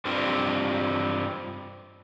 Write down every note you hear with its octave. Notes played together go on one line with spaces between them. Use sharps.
G2 G3 C4 F4